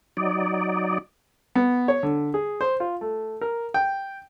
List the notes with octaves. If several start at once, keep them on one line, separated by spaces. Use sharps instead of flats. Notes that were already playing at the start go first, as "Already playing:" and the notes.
F#3 D#4 D5
B3
C#5
D3
G#4
C5
F4
A3
A#4
G5